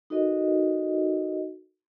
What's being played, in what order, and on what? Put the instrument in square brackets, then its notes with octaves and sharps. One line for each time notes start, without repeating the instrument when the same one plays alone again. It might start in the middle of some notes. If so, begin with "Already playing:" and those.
[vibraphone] D#4 F#4 A4 A#4 D#5